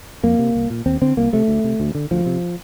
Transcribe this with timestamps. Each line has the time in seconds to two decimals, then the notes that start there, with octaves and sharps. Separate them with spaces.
0.23 F2 A#3
0.39 C3
0.55 C2
0.70 A#2
0.86 D#2 C4
1.01 D3 C4
1.17 C2 A#3
1.33 C3 A3
1.48 D2
1.64 C3
1.80 D2
1.95 D3
2.11 D2 F3
2.26 C3